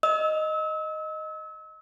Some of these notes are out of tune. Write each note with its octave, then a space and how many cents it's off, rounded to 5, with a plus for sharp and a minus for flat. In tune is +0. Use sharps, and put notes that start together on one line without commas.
D#5 +0 E6 -35